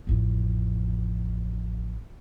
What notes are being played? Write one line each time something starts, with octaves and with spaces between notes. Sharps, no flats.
A1 F2